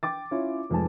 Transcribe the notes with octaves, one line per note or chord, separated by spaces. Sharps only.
G5 D6 A6
C#4 E4 F4 C#5
F1 F2 G#2 B4 G#5 A5